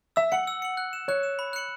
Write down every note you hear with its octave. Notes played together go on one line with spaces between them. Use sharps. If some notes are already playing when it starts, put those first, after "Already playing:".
E5 E6
F#5 C#7 F#7
E6
C#7 F#7
F#6
E7
C#5 F#6
E7
B5
F#6 C#7 F#7